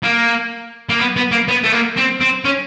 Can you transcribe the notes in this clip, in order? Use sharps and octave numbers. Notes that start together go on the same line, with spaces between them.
A#3
A#3
B3
B3
A#3
B3
A3
A#3
C4
C4
C#4